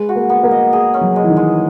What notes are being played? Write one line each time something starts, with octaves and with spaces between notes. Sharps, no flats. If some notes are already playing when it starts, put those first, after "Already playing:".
Already playing: G#3 B4
F#4
A#3
B3
A#3
D#5
G#4
C#4
F#3
G#3
E3
D#3
G#3